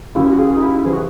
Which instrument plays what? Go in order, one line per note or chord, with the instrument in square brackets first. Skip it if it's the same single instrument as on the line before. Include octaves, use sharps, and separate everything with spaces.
[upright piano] D#2 C#3 F#3 [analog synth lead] E4
[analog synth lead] F#4
G#4
D#4
E4
[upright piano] C3 E3 [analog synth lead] G#4
[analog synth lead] F#4